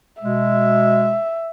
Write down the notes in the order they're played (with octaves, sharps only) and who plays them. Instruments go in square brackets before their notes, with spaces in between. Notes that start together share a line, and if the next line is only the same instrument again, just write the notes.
[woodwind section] B2 G#3 [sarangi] E5